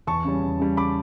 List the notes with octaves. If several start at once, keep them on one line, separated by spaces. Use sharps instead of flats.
E2 A5 C#6
C#3 G3 C#4
E2
C#3 G3 C#4
B5 D6